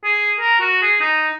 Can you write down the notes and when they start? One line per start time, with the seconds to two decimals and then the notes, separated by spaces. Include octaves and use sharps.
0.04 G#4
0.40 A#4
0.60 F#4
0.82 G#4
1.01 D#4